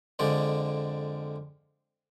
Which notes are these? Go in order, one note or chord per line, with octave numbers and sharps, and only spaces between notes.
F2 D3 G#3 D5